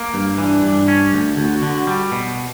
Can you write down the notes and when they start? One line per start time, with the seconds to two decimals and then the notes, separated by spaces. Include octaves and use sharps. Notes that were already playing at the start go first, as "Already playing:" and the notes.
Already playing: A#3
0.14 G2
0.38 E3 D4
0.63 G2
0.88 C#4
1.13 D2
1.37 D2 F#4
1.62 D3
1.87 G3
2.12 B2